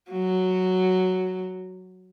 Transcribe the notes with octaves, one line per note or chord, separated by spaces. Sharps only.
F#3